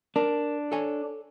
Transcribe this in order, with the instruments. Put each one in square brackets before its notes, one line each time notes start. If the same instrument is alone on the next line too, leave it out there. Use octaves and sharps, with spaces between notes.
[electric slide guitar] D4 [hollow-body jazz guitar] A#4
[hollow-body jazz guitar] A4 C#5 G#5